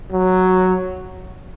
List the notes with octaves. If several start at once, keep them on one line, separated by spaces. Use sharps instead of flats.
F#3